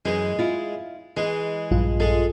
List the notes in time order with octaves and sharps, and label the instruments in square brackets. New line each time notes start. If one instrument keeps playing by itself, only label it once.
[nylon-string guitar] F#2 E3 [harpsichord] G#3
[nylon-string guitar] E4 F4
[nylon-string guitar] E3 [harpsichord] G#3
[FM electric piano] A#1 G2 F4
[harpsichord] G#3 [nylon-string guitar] A4